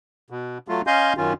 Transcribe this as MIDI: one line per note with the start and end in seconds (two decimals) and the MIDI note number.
0.30 0.58 47
0.68 0.82 54
0.68 0.82 57
0.68 0.82 65
0.87 1.13 61
0.87 1.13 75
0.87 1.13 77
0.87 1.13 80
0.87 1.13 84
0.87 1.13 91
1.17 1.33 42
1.17 1.33 51
1.17 1.33 61
1.17 1.33 65